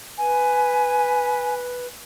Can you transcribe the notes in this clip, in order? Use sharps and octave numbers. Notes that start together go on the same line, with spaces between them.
B4 G#5